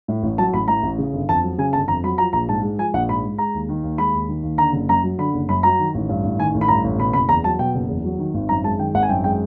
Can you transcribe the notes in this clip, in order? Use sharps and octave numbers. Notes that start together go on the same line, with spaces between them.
A2
A1
F#3 A5
A1 B5
A2 A#5
A1
C#3
G1
F2 A5
F#3
C#3 G#5
G1 A5
F2 A#5
F#3 B5
F3 A#5
A#1 A#5
G#2 A5
G#3
F3 G#5
A#1 F#5
G#2 B5
G#3
G#3 A#5
D#2
D#3
D#2
G#3 B5
D#2
D#3
D#2
D3 A#5
F#1
F#2 A#5
F#3
D3 B5
F#1
F#2 B5
F#3 A#5
D#3
A1
G2
A1
D#3 G#5
A1
B5
G2 A#5
A1
B2 B5
F#1 B5
E2 A#5
F#3 A5
B2 G5
F#1
E2
F#3
D#3
G#1
F#2 A#5
G#3 A5
D#3 G5
G#1 F#5
G#5
F#2 G5
G#3 G5